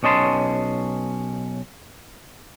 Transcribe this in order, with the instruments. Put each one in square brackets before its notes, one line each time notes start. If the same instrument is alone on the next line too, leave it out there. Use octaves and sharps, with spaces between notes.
[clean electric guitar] B1 C#4 D#5 A5 C6